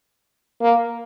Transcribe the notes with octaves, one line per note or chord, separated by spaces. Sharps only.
A#3